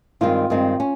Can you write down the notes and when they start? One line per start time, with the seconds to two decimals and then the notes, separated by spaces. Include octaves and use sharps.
0.21 G2 D#3 G#3 C4 F4
0.50 G2 D#3 G#3 C4
0.80 C#4